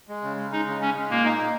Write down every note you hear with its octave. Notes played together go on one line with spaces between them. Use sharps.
G#3
C#3
G#3
G#3 D#4
C#3
G#3 C#4
G#3
A#2 A#3
D#4
A#2